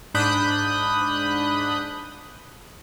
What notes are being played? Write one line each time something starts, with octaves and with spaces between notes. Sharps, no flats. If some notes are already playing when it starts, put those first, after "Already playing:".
G#2 D4 B5 D#6 F#6 G6